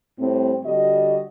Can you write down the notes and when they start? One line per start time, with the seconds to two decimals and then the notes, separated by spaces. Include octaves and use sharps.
0.19 A2 G3 C4
0.64 D3 G3 F#4 D#5